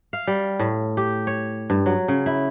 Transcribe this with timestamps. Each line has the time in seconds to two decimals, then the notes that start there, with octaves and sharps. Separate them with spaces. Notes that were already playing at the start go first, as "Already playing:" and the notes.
0.13 F5
0.27 G3
0.60 A2
0.97 G4
1.27 C#5
1.70 G2
1.86 F#3
2.08 C#3
2.26 E4